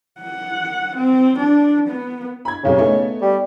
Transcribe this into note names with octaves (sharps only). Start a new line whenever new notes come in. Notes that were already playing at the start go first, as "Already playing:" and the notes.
F#5
C4
D4
B3
B5 G#6
F1 B1 C#3 G4
A3 B3 D#4
G3